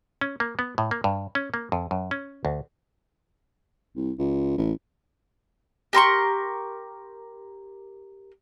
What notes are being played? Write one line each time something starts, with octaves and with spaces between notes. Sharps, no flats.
C#4
A#3
B3
A2
A#3
G2
C#4
A#3
F2
F#2
C#4
D2
C2
C#2
A1
G4 A#4 C6 C#6